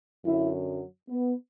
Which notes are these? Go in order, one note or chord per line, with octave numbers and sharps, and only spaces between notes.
F#2 D3 F#3 E4
B3